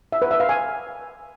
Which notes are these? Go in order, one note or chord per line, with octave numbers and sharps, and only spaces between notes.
E5
B4
E5
F5
G#5